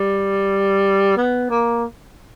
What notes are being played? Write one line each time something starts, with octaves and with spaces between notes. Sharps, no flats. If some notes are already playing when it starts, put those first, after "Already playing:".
Already playing: G3
B3
A#3